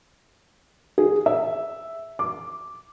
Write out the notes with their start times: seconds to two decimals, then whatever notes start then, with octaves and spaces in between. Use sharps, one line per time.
0.98 G#4
1.26 E5
2.19 D6